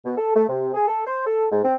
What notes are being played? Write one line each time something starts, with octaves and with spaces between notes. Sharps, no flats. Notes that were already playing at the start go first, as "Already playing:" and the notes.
B2
A4
A3
C3
G#4
A4
C5
A4
G#2
C4